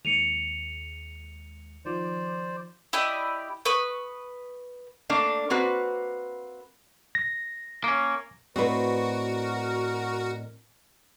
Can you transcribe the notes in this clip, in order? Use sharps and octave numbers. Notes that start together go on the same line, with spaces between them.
D#2 G#3 C#7 D#7 F7
D#3 F3 C5 D5
E4 G4 D5 D#5
B4 C#6 D#6
A3 A#3 D4
A#3 C4 F#4 B4
A#6
A#3 C#4
A2 C4 F#4 A#4 B4 D5 D#5